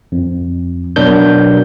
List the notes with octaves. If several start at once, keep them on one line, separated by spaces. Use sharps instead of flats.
F2
B2 F#3 D4 A#4 G6